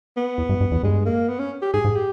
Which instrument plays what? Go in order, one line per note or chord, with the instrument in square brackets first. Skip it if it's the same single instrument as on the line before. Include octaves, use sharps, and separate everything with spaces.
[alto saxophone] B3
[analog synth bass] E2
G2
G2
E2
[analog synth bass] G2 [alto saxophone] G#3
[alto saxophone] A#3
B3
C#4
G4
[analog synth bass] G#2 [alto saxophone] G#4
[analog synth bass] G#2
[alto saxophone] G4